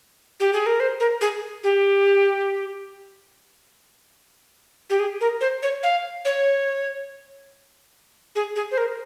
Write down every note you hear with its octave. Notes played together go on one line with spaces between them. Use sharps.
G4
G#4
A#4
C5
A#4
G#4
G4
G4
G#4
A#4
C5
C#5
F5
C#5
G#4
G#4
C5
A#4